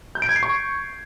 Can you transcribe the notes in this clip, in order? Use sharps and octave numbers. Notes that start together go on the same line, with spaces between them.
G6
D7
G#6
C7
C#6